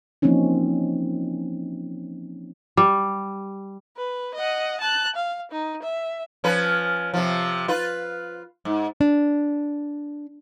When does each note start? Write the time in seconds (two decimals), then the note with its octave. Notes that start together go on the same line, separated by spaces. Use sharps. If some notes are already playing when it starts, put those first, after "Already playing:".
0.22 E3 F3 A#3 C4 C#4 D#4
2.77 G3
3.97 B4
4.34 D#5 F#5
4.81 A5 F#6
5.16 F5
5.52 D#4
5.83 E5
6.44 F3 C#4 B4
7.14 C3 F3
7.68 F4 B4
8.65 G#2
9.01 D4